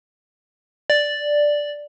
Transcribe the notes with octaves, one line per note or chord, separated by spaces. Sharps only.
D5